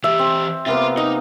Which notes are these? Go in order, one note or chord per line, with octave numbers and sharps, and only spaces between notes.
E3 G4 E5
C4
C3 A#3 B3 F4 C6
D#4 D#5